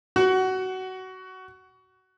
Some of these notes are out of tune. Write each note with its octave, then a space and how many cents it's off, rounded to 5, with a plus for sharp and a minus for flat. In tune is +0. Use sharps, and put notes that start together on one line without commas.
F#4 +20 F#5 +15